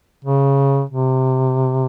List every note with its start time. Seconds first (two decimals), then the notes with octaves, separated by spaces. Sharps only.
0.25 C#3
0.90 C3